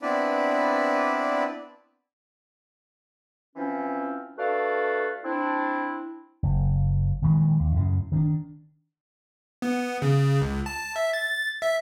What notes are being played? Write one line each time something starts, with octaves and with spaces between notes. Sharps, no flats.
B3 C4 D4 E4 B4 D5
E3 F3 C4 C#4
A3 D4 F#4 A4 B4 F5
C4 D4 E4
F#1
A#1 D#3 E3 G#3
D#2
F#2 A2 C#3
D#3 B3 D4
B3
C#3
C#2
A5
E5
A6
E5